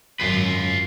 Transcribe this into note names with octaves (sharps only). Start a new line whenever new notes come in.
G#1 F#2 F4 B4